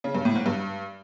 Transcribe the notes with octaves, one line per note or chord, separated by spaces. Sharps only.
C#3
G2
A2
G#2
G2